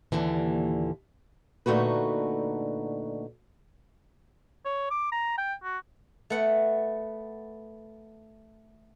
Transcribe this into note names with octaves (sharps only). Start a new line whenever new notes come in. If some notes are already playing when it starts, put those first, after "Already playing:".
D#2 A#2 D3 E3
A#2 D3 A3 D#4 F#4 B4
C#5
D6
A#5
G5
F#4
A3 B3 F#5